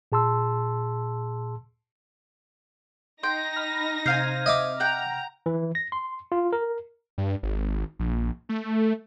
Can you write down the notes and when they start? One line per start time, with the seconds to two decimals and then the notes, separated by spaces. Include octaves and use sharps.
0.12 A#2 G#4 A5 C6 E6
3.23 D#4 G5 C6 A#6
3.56 B5 F6
4.06 C3 C5 F5 G#5 F6
4.46 D#5 E5 D6
4.80 F#5 G5 A#5
5.46 E3
5.75 A#6
5.92 C6
6.32 F4
6.53 A#4
7.18 G2
7.43 G#1
7.99 A#1
8.49 A3